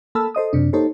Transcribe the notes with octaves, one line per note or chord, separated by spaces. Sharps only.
A#3 A4 A5 B5 E6 F6
A4 C5 D#5 D#6
F#2 C3 D4
A#3 D#4 G4 A4 C5 C#5